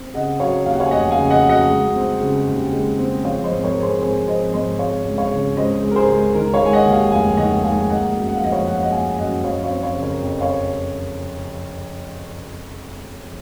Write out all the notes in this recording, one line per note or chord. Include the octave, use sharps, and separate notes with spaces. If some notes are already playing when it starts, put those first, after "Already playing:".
Already playing: C4
C#3 D#5 F#5
F#3 C#5 F5
D#2 F5
F#5
C#5 F5
G#5
F1 D#5 F#5
F5 G#5
C#3
D#5 F#5
F#3
D#5 F#5
G#3
C4
C#3
D#2
G#3
C4
F3 C#5 F5
C5 D#5
G#1
A#4 C#5
G#2
G#4 C5
G#1 G#4 C5
F3 C5 D#5
G#1 C5 D#5
G#3 C#5 F5
C#2
C#5 F5
C#3
C#2 C5 D#5
G#3
A#4
G#4 C5
C#2
D#3 A#4
C#5 F5
G#3
G#5
D#5 F#5
D#2
F5 G#5
F1 F5 G#5
D#3 D#5 F#5
G#3 F5 G#5
A#3 D#5 F#5
F#2
F#5
F5
F3 D#5
C#5 F5
F#2 F#5
F5
D#5 F#5
A#3 F5 G#5
F#2 D#5 F#5
F3 C#5 F5
C#5 F5
C4
C#5 F5
C#3
A#4 C#5
F2
C#5 F5